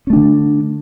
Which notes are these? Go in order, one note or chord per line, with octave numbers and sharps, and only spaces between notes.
D3 A3 C#4 D4